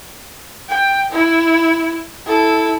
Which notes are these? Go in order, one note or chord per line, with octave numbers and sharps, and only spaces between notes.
G5
E4
E4 A4